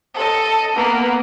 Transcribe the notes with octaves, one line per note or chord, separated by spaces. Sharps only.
A4 D#5
A#3 B3